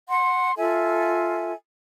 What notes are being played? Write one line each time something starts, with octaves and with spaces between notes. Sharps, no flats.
F#5 C6
F4 A4 E5 G#5